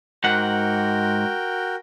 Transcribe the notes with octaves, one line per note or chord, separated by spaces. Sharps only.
G#2 F#4 A#4 F#5 G5